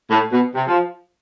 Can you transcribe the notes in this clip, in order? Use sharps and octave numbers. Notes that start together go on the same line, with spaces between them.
A2
B2
C3
F3